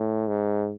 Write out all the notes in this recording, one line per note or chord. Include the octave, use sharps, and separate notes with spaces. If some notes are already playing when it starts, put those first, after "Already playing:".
Already playing: A2
G#2